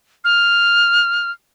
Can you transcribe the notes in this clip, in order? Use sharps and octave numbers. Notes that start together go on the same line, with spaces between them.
F6